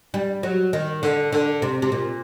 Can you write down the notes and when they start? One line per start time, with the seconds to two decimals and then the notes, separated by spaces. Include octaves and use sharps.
0.14 G3
0.43 F#3
0.73 D#3
1.03 D3
1.32 D3
1.62 C3
1.82 C3
1.92 A#2